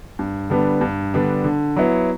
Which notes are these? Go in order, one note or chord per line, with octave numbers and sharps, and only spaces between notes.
G2
D3 G3 B3 D4
G2
D3 G3 B3 D4
D3
F#3 B3 E4